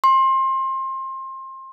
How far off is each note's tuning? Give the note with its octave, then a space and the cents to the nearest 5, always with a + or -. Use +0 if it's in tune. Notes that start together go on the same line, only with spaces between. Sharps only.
C6 +25